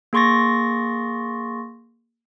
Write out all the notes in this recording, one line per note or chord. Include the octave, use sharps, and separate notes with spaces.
A#3 G#4 C6 C#6 A6 A#6